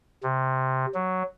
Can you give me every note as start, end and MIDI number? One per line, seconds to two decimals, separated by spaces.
0.23 0.86 48
0.94 1.23 54